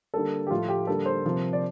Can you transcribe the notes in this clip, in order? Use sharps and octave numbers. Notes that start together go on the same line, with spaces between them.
D3 G3 A#3 A4
G4
A2 F3 A3 F4
G4
D3 G3 A#3 A4
C5
C3 F3 A#3
D5